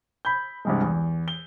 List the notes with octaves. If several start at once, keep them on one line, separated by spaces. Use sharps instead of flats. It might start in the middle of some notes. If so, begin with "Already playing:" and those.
B5 G6
C2 G2 G#3
E2
G7